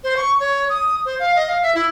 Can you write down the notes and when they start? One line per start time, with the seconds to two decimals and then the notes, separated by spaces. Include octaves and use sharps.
0.04 C5
0.17 C#6
0.40 C#5
0.69 D#6
1.05 C5
1.19 F5
1.36 D#5
1.48 F5
1.63 E5
1.75 E4